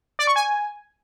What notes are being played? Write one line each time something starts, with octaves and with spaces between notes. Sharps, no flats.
D5
C#6
G#5